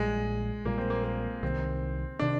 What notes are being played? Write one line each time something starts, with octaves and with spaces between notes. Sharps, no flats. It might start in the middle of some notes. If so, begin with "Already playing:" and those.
Already playing: A#1 A#2 G3 G#3
A#1 A#2 G3 A#3
C4
A#3
A#3
C2 C3 D#3 C4
C3 D#3 D4